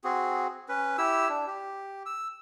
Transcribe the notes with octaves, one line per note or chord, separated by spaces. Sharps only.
C4 F#4 G#4
C#4 B4
E4 G4 E6
D4
G4
E6